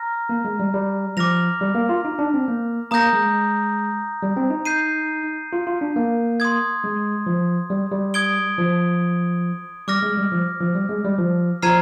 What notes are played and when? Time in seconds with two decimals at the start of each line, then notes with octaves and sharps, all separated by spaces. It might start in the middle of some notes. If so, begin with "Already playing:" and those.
Already playing: A#5 F6 A#6
0.29 A#3
0.45 G#3
0.60 G3
0.74 G3
1.17 F3 D6 F6 A#6 F7
1.61 G3
1.75 A#3
1.89 F4
2.05 D#4
2.19 D4
2.34 C4
2.48 A#3
2.91 A#3 A#5 D#6 G6 A#6
3.13 G#3
4.22 G3
4.37 C4
4.51 D#4
4.65 G6 C7 D#7
5.53 F4
5.67 F4
5.81 D4
5.96 A#3
6.40 C6 D#6 G#6
6.84 G#3
7.26 F3
7.70 G3
7.92 G3
8.14 D#6 G#6 D7 G7
8.58 F3
9.88 G3 D6 F6 A#6
10.03 G#3
10.18 G3
10.32 F3
10.60 F3
10.75 G3
10.89 G#3
11.05 G3
11.19 F3
11.62 F3 A#5 F6 G#6 C7 D#7